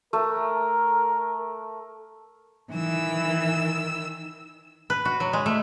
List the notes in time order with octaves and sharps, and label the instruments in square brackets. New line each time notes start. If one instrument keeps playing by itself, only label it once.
[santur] A3 [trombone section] A#4
[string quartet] D#3 E6 [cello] E3
[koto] B4
F#4
F#3
G#3
A3